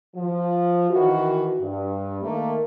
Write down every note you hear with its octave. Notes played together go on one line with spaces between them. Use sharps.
F3
D#3 E3 F#4
G2
D#3 A3 A#3